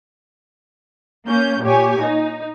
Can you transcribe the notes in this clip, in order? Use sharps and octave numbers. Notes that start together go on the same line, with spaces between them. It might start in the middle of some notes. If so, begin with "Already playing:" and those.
A#3 C#4 G6
A#2 G4 C#5 G#5
D#4